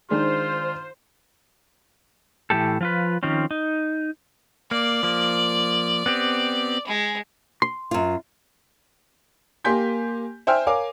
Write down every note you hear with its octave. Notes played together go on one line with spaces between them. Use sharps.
D#3 G#3 D4 F4 C5
A2 E3 A#3 G4 A4
F3 F4 B4
D#3 F3 C4 C#4
D#4
A#3 D5
F3 A#3
B3 C4 G4
G#3
C6
F#2 F4
A#3 G4 G#5 C6 G6 B6
C5 E5 G5 G#5 F6
A#4 C#5 F5 G#5 D6